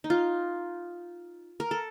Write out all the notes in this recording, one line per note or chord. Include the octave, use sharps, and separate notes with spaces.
D#4
F4
A#4
A4